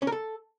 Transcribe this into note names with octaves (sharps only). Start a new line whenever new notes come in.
C#4
A#4
A4